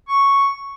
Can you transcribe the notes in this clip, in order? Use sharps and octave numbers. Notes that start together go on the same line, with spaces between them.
C#6